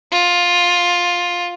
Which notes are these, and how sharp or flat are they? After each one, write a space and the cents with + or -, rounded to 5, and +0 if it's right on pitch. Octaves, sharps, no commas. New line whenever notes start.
F4 +10